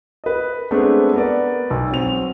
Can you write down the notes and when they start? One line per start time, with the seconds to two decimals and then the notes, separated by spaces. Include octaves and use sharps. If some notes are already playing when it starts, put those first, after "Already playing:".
0.24 B4 D#5
0.71 G#3 A3 B3 C4 D4
1.14 B3 A#4 D5
1.70 B1
1.91 F#3 C4 F7